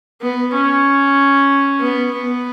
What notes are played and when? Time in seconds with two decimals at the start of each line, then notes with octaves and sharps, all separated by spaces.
0.22 B3
0.53 C#4
1.81 B3
2.12 B3